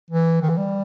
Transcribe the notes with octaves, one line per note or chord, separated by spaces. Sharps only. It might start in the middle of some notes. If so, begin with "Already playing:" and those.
E3
D#3
E3
G3